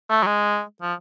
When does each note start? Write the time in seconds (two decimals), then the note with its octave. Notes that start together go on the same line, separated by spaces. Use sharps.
0.09 A3
0.23 F#3
0.27 G#3
0.82 F3